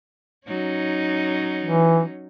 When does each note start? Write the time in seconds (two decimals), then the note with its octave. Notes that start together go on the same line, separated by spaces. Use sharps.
0.47 F#3 C#4 D#4
1.63 E3